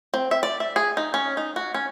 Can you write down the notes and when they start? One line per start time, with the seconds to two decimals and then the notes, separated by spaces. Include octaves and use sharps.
0.14 C4
0.31 E5
0.43 D5
0.60 E5
0.76 G#4
0.97 D#4
1.14 C#4
1.37 D#4
1.56 F#4
1.74 C#4